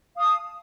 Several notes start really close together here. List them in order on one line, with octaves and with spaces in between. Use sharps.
F5 D#6 A5